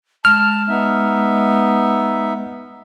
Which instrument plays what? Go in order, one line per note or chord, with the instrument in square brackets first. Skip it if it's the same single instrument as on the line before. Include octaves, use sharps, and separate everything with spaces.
[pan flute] G#3 [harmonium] A5 [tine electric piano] F6
[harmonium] B3 D#4 E5